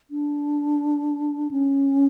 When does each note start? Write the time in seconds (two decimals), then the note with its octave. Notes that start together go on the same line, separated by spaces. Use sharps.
0.11 D4
1.51 C#4